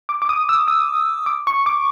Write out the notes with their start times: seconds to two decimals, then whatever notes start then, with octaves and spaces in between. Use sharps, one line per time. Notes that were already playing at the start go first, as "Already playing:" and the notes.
0.09 D6
0.22 D6
0.29 D#6
0.49 E6
0.68 D#6
1.26 D6
1.47 C#6
1.66 D6